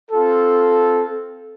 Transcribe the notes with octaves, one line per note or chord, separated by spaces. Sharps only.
C4 F4 A4